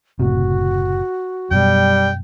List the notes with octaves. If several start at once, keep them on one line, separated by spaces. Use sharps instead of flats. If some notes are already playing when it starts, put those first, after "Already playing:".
F#1 A2 C3 F#4
F#2 B2 G3 G5